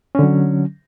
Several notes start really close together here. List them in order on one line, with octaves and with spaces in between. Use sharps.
C#4 D3 F#3